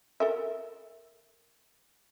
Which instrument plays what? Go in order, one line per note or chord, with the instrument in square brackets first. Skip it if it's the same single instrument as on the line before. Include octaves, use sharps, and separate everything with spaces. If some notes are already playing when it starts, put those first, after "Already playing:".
[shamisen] A4 A#4 E5